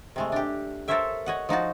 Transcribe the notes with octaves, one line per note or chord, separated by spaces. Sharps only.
C3 G#3 A3
D4 G4
A4 A#4 C5 C#5 E5 G5
C#5 D#5 F#5
F3 D#4 F#4 A5